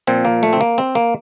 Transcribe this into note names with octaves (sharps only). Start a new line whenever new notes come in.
A#2 F3 C4
A#3
A3
C4
A#3
C4
A#3